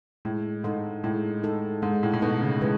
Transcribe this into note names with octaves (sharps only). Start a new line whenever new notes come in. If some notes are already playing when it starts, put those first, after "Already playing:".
A2 G#3
G#2 D#4 A4
A2 G#3
D#4 A4
G#2 G#3
A2
A2
B2 D#4 A4
C#3
E3 G#3